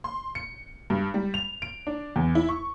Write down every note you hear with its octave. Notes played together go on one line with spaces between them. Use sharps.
C6
C#7
G2
G3
F7
D7
D4
E2
E4
C#6